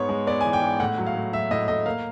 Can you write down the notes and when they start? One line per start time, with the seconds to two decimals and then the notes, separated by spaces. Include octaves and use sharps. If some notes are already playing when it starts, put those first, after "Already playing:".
Already playing: G#2 B3 C#5
0.09 G#3
0.27 B3 D5
0.41 E3 G#5
0.53 G5
0.62 G#2
0.80 A2 F#5
0.98 F#3
1.06 F5
1.16 A2
1.33 F#3 E5
1.51 A2 D#5
1.68 A2 D#5
1.86 A#3 F5